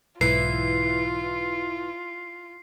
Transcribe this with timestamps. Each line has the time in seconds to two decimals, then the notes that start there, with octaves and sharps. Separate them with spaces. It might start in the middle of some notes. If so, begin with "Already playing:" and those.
0.21 B1 G#2 E3 F4 C7